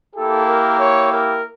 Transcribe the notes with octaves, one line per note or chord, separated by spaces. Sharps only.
A#3 E4 G4 A4
A#4
C#5
A#4